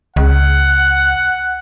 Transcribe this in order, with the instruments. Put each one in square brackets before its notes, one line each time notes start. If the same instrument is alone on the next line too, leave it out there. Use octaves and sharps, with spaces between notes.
[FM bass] C#2 [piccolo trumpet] F#5